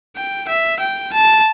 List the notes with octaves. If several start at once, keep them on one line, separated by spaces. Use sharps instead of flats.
G5
E5
G5
A5